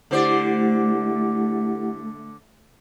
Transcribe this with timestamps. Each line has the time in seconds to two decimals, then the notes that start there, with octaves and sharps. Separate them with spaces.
0.11 D3 A3 E4 G4 C5 D5 F#5